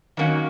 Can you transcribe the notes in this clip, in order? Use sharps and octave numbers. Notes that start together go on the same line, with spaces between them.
D#3 F#3 A#3 C#4 F#4